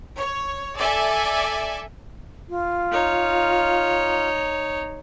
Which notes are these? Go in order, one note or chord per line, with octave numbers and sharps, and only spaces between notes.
C#5
A4 D5 E5 G#5
F4
D#4 C#5